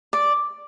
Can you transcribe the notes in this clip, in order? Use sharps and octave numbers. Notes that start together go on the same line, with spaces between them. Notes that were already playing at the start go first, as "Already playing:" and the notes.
D5